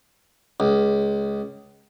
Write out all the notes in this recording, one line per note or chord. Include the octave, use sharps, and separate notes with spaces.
C#2